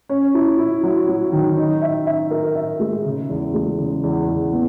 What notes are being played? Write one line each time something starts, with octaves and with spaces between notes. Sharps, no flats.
C#4
E4
E4
F#3
F#3
D#3
D#4
E5
E5
A#4
E5
G#3
C#3
E2
G#3
C#3
E2
E2
B3